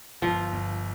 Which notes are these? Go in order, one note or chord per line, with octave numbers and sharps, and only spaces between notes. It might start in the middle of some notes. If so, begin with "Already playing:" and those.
G1 F3
G1